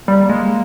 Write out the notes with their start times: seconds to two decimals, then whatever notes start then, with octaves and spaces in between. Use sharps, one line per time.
0.08 G3 A#3
0.29 G#3